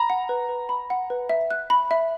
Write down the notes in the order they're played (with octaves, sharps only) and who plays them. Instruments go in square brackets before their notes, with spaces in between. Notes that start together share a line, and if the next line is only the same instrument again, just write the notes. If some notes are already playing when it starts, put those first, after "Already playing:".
Already playing: [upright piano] A#5 [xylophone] B5
[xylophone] F#5
B4
B4
B5
F#5
B4
E5
F#6
B5
E5